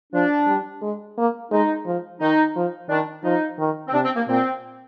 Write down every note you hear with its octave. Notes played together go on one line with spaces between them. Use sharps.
F3 D4
G3
G#3
A#3
G#3 D#4
F3
D#3 D#4
F3
D#3 D4
F3 D#4
D#3
C4
C3 D4
C4
A#3
A#2 C4